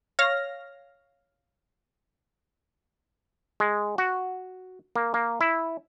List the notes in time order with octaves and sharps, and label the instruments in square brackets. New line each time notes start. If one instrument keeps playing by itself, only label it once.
[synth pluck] C#5 F5 F6 A#6
[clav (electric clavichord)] G#3
F#4
A#3
A#3
E4